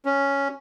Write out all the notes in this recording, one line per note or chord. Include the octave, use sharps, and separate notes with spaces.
C#4